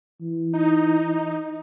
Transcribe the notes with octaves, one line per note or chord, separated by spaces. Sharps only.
E3
D#4